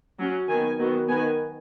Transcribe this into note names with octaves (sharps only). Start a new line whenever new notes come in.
F#3 C#4
D#3 B3 G#5
D#3 F#3 B3
D#3 B3 G#5